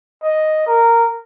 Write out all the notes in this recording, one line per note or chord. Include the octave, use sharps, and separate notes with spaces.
D#5
A#4